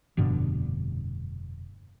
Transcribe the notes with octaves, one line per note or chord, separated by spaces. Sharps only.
F1 G2 B2 D3